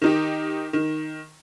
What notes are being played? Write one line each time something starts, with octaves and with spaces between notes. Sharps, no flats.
D#3 D#4 G4
D#3